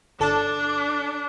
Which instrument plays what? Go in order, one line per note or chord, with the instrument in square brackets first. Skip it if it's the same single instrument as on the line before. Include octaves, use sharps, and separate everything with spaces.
[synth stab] G1 A4 A5 [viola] D4